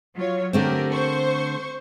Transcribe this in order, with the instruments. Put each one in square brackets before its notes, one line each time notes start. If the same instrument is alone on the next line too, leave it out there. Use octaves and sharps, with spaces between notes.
[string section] F#3 F4 C#5
[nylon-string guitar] D3 A3 C4 [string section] G4 A#4
[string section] C5 C#6